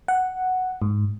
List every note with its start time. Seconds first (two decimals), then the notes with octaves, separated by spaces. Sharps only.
0.08 F#5
0.82 G#2